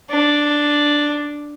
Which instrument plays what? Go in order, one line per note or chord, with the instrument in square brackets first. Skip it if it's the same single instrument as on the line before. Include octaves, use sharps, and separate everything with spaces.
[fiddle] D4